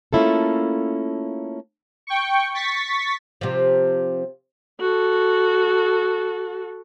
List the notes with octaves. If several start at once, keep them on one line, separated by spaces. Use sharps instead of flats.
A3 A#3 C#4 E4 F4 A4
G5 C#6
C#6 A6 B6
C3 F3
F#4 A4